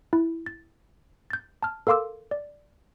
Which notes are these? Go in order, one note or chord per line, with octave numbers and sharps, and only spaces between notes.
E4
A6
G6 A6
A5 F6
A4 A#4 F5 C6 D6 E6
D5